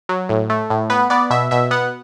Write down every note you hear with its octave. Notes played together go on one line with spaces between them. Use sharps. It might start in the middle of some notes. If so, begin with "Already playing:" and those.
F#3
A2
A3
A2
B3 B4
B3 D5
B2 E5
B2 E5
B3 F#5